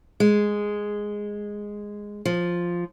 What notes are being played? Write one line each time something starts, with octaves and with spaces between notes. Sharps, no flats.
G#3
F3